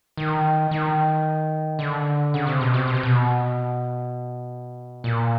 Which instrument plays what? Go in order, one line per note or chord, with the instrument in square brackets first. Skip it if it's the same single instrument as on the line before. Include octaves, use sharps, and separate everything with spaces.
[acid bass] D#3
D#3
D3
C#3
C3
B2
C3
B2
C3
B2
A#2